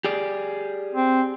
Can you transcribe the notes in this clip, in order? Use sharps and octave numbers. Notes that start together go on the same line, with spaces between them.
G4 G#4 D5
C4